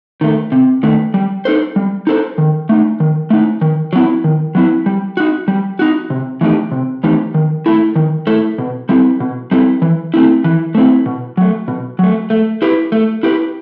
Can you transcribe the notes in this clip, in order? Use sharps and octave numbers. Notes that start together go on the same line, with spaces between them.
D#3 A3
C3
D#3 A3
G3
D#4 A4 C5
G3
D#4 A4 C5
D#3
A3 D#4
D#3
A3 D#4
D#3
F#3 B3 E4
D#3
F#3 B3 E4
G3
D#4 F#4
G3
D#4 F#4
C3
E3 A3 D#4 G4
C3
E3 A3 D#4 G4
D#3
A3 E4 A4
D#3
A3 E4 A4
B2
G3 C4 E4 A4
B2
G3 C4 E4 A4
E3
A3 C4 E4
E3
A3 C4 E4
B2
F#3 A3
B2
F#3 A3
A3
E4 G4 B4
A3
E4 G4 B4